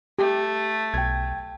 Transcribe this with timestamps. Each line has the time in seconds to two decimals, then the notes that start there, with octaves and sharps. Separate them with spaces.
0.19 A3 G4
0.94 B1 G5 G#6